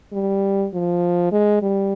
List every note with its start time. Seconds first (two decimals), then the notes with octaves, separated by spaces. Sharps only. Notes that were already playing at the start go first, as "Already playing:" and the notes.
0.13 G3
0.73 F3
1.32 G#3
1.62 G3